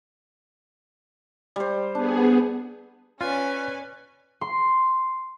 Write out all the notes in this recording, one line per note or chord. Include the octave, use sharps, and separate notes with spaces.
G3 C5
B3 D4 G#4
C#4 F4 B4 D5 G#5 F#6
C6